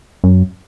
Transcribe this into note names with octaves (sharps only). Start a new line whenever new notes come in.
F#2